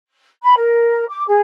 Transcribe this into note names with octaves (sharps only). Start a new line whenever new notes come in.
B5
A#4
D6
G#4